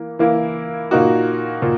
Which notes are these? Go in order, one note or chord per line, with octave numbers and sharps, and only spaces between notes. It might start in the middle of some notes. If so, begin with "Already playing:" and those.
Already playing: E3 A#3
E3 A#3 E4
A#2 A#3 D#4 F#4
A#2